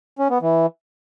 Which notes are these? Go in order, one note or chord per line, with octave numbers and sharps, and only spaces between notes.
C#4
B3
E3